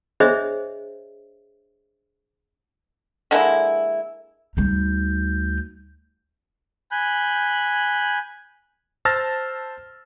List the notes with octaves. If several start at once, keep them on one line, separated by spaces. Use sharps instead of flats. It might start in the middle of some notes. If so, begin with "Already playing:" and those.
D4 G#4 C5 C#5 D#5 E5
D3 G#3 A#3 E4
D2 G3 D#4 G6
G#5 B5 F#6 G6
C5 A5 E6 F6 A6 A#6